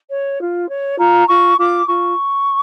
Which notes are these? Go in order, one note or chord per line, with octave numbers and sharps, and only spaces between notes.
C#5
F4
C#5
F4 A#5
F4 C#6
F4 D6
F4 C#6